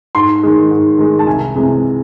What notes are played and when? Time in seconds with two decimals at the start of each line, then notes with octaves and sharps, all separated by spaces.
0.15 G#2 C6
0.43 D#3 G#3
0.71 G#2
0.98 D#3 G#3
1.19 A5
1.27 C2 G#5
1.55 C3 E3 G#3